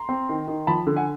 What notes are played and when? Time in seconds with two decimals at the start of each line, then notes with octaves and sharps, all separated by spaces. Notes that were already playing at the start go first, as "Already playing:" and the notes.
Already playing: A#5 C6
0.09 C4
0.29 D#3
0.48 D#3
0.67 F3 A5 B5
0.87 D3
0.96 F#5 G#5